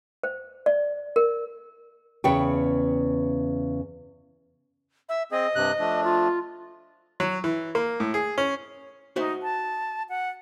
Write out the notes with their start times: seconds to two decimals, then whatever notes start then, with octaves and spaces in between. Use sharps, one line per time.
0.23 C5
0.66 D5
1.16 A#4
2.24 E2 C#3 B4 C#5 G5
5.09 E5
5.31 C4 G#4 D#5
5.55 G2 C3 F#6
5.80 F3 A3 D4
6.04 F4
7.20 F#3
7.44 E3
7.75 A#3
8.00 A2
8.14 G#4
8.38 C#4
9.16 D#4 F#4 C5 E5
9.42 A5
10.09 F#5